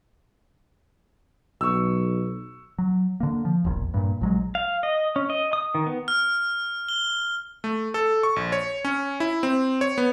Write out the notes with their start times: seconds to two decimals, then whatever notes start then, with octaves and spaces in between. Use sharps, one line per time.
1.61 B1 C#6 E6
2.78 F#3
3.20 D3 A#3
3.45 F3
3.65 E1 A#1
3.94 G2 A#2
4.21 A#1 F#3 G#3
4.55 F5
4.83 D#5
5.16 C#4
5.30 D#5
5.53 D#6
5.75 D#3
5.87 B3
6.08 F6
6.89 G7
7.64 A3
7.94 A4
8.23 C#6
8.36 A#1
8.52 C#5
8.85 C#4
9.20 E4
9.43 C4
9.81 C#5
9.98 B3